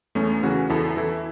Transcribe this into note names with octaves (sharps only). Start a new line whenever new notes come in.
E2 A3 C#4
C#3 E3 C#4 F#4
E2 E4 A4
E3 E4 A4